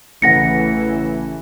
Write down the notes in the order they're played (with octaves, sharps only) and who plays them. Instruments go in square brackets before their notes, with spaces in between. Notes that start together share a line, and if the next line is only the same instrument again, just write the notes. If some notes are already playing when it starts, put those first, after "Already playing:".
[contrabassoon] A1 [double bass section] C#3 E3 A3 [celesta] F#5 A#6 C#7